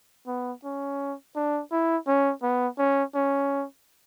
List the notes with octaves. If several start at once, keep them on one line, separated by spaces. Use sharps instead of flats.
B3
C#4
D4
E4
C#4
B3
C#4
C#4